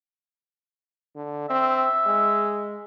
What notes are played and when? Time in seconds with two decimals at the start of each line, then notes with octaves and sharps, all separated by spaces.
1.16 D3
1.50 C4 E5
2.06 G#3